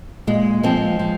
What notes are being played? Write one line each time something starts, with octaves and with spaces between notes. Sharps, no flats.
A#2 G#3
F3 G#3 C4
F3